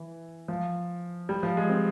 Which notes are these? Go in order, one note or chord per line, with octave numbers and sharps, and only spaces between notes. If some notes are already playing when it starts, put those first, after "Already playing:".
Already playing: E3
F3
G3
F3
G#3
C4